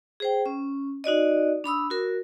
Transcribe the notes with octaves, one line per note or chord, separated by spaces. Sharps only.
G#4 C5 G5
C#4
D#4 F#4 D5 D#5
D4 B5 D#6 E6
F#4 A#4